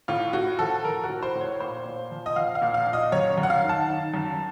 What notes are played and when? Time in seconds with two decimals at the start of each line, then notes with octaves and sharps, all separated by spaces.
0.08 A2 F4
0.33 A2 F#4
0.59 F3 A4
0.84 F3 A#4
1.04 F#4
1.09 A2
1.23 C5
1.35 A2
1.41 C#5
1.60 A#2 C5
1.85 A#2
2.11 F3
2.26 D#5
2.36 F3 F5
2.55 F5
2.62 A#2
2.74 F5
2.87 A#2
2.93 D#5
3.12 F#2 C#5
3.38 F#2
3.43 F#5
3.50 F5
3.63 D#3
3.69 A5
3.88 D#3
4.14 F#2